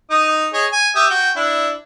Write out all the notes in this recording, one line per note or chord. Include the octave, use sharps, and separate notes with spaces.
D#4 D#6
G#4 C#5 D#5
G#5
G4 E5 D#6
F#4 G5
D4 E4